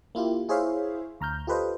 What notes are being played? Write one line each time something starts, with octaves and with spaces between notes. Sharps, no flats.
A#3 E4 F4 G4
E4 G#4 C5 C#5 E5 F5
D2 A#5 F6 G6
F4 G4 A4 B4 C5 D#5